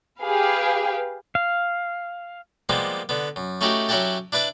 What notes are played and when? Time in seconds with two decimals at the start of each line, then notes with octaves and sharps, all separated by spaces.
0.21 G4 G#4 B4 F5
1.35 F5
2.69 F3 G3 G#3 A#3 B3
3.09 D3 B3
3.36 F#2
3.61 A3 C#4 D#4 E4 F#4 G4
3.89 F#3 C#4 E4 F#4 G4 A4
4.32 D4 E4 B4 D5